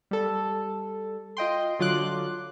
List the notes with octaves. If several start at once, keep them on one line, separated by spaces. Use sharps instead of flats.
G3 A4
F4 D#5 G5 C6
D3 F#3 F4 C6 D6 F#6